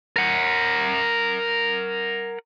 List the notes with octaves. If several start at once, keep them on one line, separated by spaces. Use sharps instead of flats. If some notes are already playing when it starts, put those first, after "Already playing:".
A#4 F#5